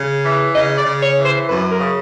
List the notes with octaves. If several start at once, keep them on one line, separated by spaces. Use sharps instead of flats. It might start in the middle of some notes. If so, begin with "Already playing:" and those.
Already playing: C#3
E3
C#3 D#5
D5
C#3
C#5
E3
C5
F#2 B4
A#4
C#3